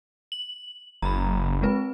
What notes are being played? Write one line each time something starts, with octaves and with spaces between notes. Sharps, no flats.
F#7
F#1 A#5 B5
G#3 C4 B4